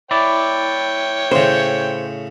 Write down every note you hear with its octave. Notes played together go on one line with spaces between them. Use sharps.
E4 C#5 D5 G5
A2 C#3 C5